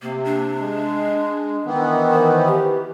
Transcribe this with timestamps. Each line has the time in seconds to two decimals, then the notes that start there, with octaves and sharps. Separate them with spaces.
0.02 C3 A#3
0.25 D4
0.61 G#3
1.66 D#3 E3 B3
2.12 C5
2.47 G4